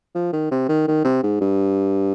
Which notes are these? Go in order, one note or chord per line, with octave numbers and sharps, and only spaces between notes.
F3
D#3
C3
D#3
D#3
C3
G#2
G2